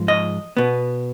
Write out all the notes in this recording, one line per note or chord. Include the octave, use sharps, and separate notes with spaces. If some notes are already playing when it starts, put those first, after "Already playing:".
Already playing: G#2 F3 G#3
D#5
B2 B3